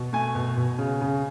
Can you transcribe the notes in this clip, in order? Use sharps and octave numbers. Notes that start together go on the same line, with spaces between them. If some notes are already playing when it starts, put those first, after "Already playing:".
Already playing: B2
A3 G#5
B2
B2
C#3
C#3